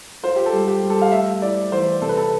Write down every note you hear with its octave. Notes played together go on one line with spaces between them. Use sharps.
F4 C5
G4
A4
G3
G4
G3
A4
F5
A3 E5
E4 D5
E3 C5
C3 A4
B4
A4